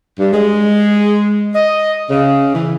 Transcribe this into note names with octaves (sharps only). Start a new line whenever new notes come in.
G2
G#3
D#5
C#3
E3